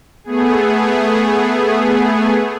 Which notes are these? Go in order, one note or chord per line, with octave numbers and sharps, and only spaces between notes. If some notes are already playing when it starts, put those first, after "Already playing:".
A3 B3 G#4